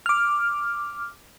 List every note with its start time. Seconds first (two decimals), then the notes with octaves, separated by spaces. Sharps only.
0.06 D6 F6